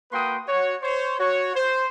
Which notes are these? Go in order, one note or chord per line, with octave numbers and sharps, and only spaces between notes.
A#3 F#4 B4 G5 C6 D#6
F#4 C#5
C5 C#5
F#4 C#5
C5